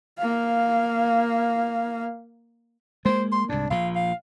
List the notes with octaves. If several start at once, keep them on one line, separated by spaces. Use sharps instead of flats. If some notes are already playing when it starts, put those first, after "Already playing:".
A#3 F5
G#3 A#3 C5
C6
C2 G#2 D4
A#1 A#2 F3 F5
F5